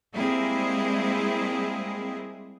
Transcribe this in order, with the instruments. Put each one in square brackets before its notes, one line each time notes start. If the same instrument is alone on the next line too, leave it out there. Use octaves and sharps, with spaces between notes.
[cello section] G3 G#3 A#3 C4 E4 G#4